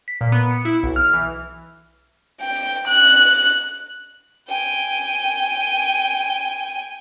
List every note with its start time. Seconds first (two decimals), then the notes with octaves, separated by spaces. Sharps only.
0.08 B6
0.21 A#2
0.32 B3
0.51 C#7
0.65 E4
0.83 B1
0.96 F6
1.13 E3
2.41 G5
2.88 F#6
4.49 G5 G#5